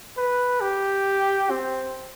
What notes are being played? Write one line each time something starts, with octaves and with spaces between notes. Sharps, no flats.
B4
G4
C4